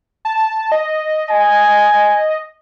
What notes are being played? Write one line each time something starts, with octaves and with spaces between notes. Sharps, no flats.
A5
D#5
G#5